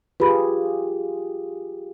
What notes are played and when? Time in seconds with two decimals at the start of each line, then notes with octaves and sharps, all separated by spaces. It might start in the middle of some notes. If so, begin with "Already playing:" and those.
0.20 F4 G4 G#4 B4 B5